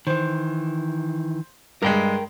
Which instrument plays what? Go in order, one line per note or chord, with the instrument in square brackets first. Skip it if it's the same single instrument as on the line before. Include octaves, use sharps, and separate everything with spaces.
[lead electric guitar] D#3 E3 [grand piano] C5
[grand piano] G2 G#3 [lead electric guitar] A#4 G5